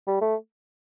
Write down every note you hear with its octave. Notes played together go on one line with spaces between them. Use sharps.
G3
A3